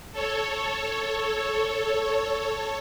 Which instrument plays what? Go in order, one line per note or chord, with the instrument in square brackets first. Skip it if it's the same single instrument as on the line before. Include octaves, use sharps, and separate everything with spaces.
[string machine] A4 C#5